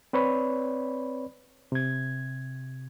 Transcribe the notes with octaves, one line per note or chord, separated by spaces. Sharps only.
C4 B4 C#5 D5 B5
C3 G#6